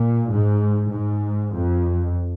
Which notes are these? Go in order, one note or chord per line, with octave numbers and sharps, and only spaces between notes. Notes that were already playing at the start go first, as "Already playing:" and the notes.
Already playing: A#2
G#2
G#2
F2